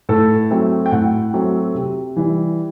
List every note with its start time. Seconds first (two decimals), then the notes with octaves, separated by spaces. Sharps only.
0.09 A2 A4
0.51 F#3 A3 C4
0.86 G5
0.92 A2 F#5
1.34 F#3 A3 C4
1.75 C3
2.16 E3 G3